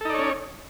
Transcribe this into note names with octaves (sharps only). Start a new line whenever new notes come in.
C#4 D#4 A4 C#5 D5